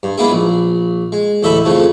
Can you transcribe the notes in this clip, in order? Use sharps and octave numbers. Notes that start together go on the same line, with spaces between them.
G2
G#3 A#3 B3 E4 G#4
A#1
G#3
A1 D2 A4 D#5 E5 B5
F2 C#3 F3 A3